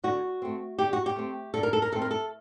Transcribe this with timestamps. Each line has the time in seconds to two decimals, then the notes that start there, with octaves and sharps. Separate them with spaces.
0.04 D3 F#4
0.42 A3 C4
0.79 D3 G4
0.93 F#4
1.06 G4
1.16 A3 C4
1.54 D3 A4
1.63 A#4
1.73 A4
1.82 A#4
1.92 A3 C4 A4
2.02 A#4
2.11 A4